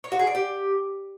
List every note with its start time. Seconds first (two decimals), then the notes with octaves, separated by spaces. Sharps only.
0.04 C#5
0.12 F#4
0.19 G#4
0.27 D5
0.35 G4